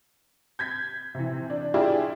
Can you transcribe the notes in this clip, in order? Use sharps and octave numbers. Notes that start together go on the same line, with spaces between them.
G6 G#6 B6
C3 E3
D4
D4 E4 F4 G4 G#4 D5